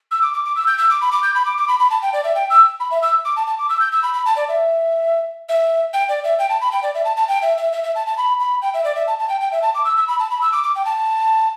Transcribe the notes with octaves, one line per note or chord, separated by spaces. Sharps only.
E6
D6
D6
D6
E6
G6
E6
D6
B5
D6
G6
B5
D6
D6
B5
B5
A5
G5
D5
E5
G5
E6
B5
E5
E6
D6
A5
A5
D6
E6
G6
E6
B5
B5
A5
D5
E5
E5
G5
D5
E5
G5
A5
B5
G5
D5
E5
A5
A5
G5
E5
E5
E5
E5
A5
A5
B5
B5
G5
E5
D5
E5
A5
A5
G5
G5
E5
A5
D6
E6
E6
B5
A5
B5
E6
D6
D6
G5
A5